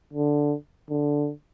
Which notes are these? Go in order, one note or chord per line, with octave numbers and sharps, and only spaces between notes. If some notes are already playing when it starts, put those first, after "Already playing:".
D3
D3